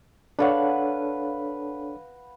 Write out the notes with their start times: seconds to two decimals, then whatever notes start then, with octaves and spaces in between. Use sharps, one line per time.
0.39 D4 A4 B4 C#5 F5 F#5